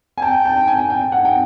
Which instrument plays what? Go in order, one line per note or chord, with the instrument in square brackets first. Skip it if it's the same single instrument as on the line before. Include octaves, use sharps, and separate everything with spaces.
[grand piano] G#5
[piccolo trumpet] G5 [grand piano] A5
[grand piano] A5
G#5
G5
F#5
G5